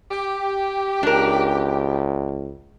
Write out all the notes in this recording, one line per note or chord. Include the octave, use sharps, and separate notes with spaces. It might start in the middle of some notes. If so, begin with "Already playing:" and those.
G4
C#2 D4 A#4